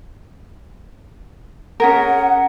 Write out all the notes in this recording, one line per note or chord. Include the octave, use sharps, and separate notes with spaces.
C#4 G#4 A#4 F#5